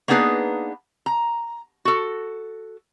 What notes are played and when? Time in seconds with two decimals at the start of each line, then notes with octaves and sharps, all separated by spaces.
0.08 A#3 B3 D4 D#4 G#4 B4
1.06 A#5
1.85 F#4 A4